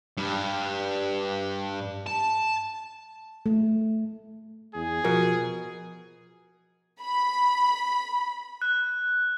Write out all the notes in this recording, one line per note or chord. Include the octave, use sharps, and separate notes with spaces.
G2
A5
A3
E2 G#4
B2 F3 A#4
B5
F#6